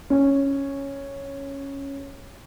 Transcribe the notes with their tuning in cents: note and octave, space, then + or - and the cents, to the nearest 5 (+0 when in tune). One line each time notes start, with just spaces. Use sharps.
C#4 -5